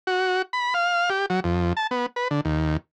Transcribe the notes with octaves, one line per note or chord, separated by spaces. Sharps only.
F#4
B5
F5
G4
F#3
F2
A5
B3
B4
D3
D#2